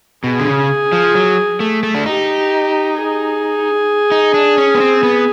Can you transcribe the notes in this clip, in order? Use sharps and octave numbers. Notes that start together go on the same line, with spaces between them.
B2 G#4
D3
C#3
F3
F#3
A3
A3
D4
D#4 G4
G#4
D#4
D4
C#4
B3
C4
B3